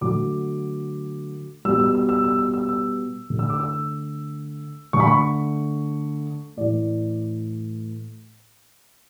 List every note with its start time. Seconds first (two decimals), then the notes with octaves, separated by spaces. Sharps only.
0.01 D3 F#3 A3 D6
1.65 B2 G3 E6
1.80 E6
1.95 E6
2.09 E6
2.24 E6
2.39 E6
2.54 E6
2.69 E6
3.30 D3 A3
3.39 E6
3.50 D6
3.60 E6
4.93 D3 A3 C#6
5.00 B5
5.07 C#6
6.57 A2 E3 A3 D5